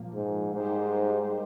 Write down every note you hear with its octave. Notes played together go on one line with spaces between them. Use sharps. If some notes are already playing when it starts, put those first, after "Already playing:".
Already playing: A#2 F3 A#3
G#2
G#2 G3 A#3 D#4 G4 C5